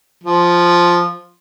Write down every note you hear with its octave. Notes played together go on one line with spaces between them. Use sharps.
F3